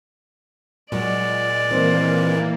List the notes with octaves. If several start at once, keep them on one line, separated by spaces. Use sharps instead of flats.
A#2 F#3 G#3 C#5 D5
D#3 E3 A#3 C4 C5